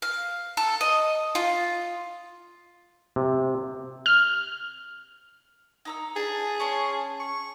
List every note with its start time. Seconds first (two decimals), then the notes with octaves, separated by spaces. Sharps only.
0.02 F5
0.57 A4
0.81 D#5
1.35 F4
3.16 C3
4.06 F6
5.85 D#4 A#5 E6
6.16 D4 G#4
6.60 C#4 A5 C6
7.19 C#6